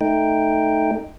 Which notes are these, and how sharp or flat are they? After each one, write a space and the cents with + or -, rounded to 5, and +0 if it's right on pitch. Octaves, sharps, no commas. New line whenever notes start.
A3 +0 D#4 +0 G5 +0